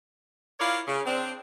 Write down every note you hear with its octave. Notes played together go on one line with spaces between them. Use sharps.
E4 F4 A#4 C#5 D5 F5
C#3
C4 D4